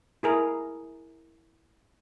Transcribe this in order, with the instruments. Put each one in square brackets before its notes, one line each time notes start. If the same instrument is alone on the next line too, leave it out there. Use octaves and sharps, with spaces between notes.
[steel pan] E4 G#4 A#4